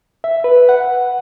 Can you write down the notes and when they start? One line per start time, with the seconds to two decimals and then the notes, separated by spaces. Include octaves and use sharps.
0.24 E5
0.44 B4
0.69 F#5